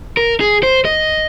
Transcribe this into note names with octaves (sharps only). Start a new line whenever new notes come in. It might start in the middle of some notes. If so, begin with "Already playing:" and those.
A#4
G#4
C5
D#5